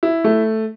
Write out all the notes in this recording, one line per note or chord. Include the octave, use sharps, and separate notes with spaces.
E4
A3